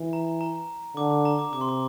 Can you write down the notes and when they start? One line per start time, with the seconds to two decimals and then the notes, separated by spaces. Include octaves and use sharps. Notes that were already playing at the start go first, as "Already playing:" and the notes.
Already playing: E3
0.13 A#5
0.41 A#5
0.97 D3 D6
1.10 D6
1.25 A#5
1.39 D6
1.53 C3 D6
1.61 C6
1.69 D6